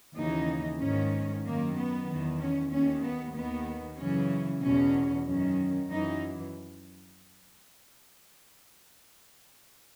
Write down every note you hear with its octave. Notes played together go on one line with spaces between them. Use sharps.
D#2 C#3 E3 D#4
G#2 D#3 C#4
F#2 D#3 A#3
B3
E2 D#3
C#4
D#2 D#3 C#4
B3
D#2 D#3 B3
F#2 C#3 E3 C#4
E2 B2 C#4
F#2 D#3 C#4
F#2 E3 D#4